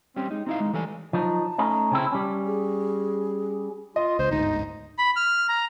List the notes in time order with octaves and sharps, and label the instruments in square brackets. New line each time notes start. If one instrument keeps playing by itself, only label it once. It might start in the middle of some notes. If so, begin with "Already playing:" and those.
[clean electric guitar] G3 C#4 G4 [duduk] C4
[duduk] G#3 [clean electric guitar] D#4
[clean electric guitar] C4 E4 F5 [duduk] D#4
[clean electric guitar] D#2 G#3
[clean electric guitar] E3 A4 G#5 [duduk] G3
[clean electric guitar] F3 F#3 D#4 [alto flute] A5
[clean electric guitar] A3 C#4 D#4
C#3 C4 E4
G3 C#4
[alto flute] G#4
[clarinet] F4 [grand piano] D#5
[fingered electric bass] C#2 [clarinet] C5
[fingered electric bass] G1 D2 G#2 [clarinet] D#4
[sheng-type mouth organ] B5
F6
A#5